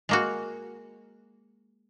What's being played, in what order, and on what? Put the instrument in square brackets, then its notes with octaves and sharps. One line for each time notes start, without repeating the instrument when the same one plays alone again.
[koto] G#3 A#3 F#4